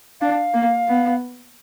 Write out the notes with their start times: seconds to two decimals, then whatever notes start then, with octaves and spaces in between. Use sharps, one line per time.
0.21 D4 F5
0.54 A#3
0.88 B3